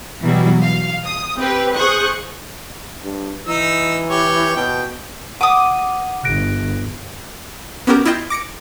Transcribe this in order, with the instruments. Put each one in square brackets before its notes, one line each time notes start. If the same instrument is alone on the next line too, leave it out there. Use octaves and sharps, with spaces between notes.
[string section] B2 E3 F#3 G3 E4
F5
D#6
C4 G4 B4
G#4 C5 C#6 D#6 F#6
[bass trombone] G2
[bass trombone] E3 [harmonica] D#4 E6
[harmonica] G4 C#5
[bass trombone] B2 [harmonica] G5
[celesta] F#5 D#7 [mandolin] D6 D#6
[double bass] G1 [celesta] F#6 A#6 D7
[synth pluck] B3 C#4 F#4 G4 A#4
E4 F4 D#5 G5
D6 A#6 C#7 D7